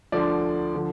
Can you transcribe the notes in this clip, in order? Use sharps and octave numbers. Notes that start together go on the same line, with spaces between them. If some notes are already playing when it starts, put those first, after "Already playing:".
D2 D3 F3 D5
D3 F3